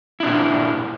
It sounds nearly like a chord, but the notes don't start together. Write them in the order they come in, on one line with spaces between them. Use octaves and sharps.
E4 D4 A#2